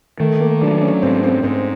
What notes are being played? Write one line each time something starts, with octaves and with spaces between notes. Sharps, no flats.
D#3 A3
A#3
F#3 D4
C#4
G#2 C4
C4
G#2 C4